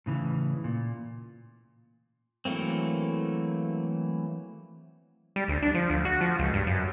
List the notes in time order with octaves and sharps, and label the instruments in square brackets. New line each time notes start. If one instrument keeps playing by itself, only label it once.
[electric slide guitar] A2 C#3 E3
A#2
[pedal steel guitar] E3 F#3 A3 A#3 C4
[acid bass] G3
D2
D4
F3
D2
F#4
F3
C#2
G2
F#2